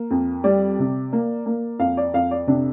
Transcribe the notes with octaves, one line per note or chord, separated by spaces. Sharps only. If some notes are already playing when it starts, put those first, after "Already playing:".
Already playing: A#3
F2
G3 D5
C3
A#3
A#3
F2 F5
D5
F2 F5
D5
C3 D4